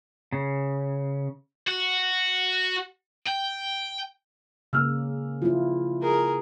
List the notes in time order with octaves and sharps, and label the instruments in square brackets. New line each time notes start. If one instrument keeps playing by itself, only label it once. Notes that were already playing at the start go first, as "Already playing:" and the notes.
[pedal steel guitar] C#3
[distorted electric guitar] F#4
G5
[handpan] C#3 A#3 [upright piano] E6 F6
[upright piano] F3 [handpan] E4 F4
[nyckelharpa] G#4 A#4